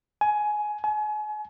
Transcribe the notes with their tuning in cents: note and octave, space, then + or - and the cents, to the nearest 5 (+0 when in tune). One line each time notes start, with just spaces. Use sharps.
G#5 +15
G#5 +35